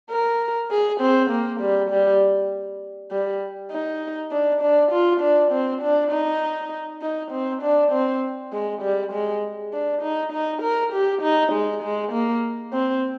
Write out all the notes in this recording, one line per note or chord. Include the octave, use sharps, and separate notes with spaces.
A#4
G#4
C4
A#3
G3
G3
G3
D#4
D4
D4
F4
D4
C4
D4
D#4
D#4
C4
D4
C4
G#3
G3
G#3
D4
D#4
D#4
A#4
G4
D#4
G#3
G#3
A#3
C4